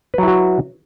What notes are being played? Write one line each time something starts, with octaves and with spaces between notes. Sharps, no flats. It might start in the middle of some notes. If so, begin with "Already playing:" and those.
F#3 E4 F#4 B4